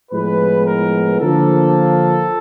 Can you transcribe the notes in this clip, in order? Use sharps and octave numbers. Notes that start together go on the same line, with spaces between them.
A2 F3 G#3 B3 B4
A#4
D3 F3 A#3 A4